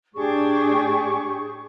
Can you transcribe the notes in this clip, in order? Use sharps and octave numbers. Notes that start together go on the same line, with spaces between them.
A2 D4 G4 G#4 C#6